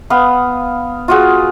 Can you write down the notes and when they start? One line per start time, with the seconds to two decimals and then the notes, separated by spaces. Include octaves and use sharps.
0.10 B3 F5 D#6
1.08 F4 F#4 G#4